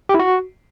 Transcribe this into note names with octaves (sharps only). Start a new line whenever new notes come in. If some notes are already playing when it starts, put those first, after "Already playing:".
G4
E4
F#4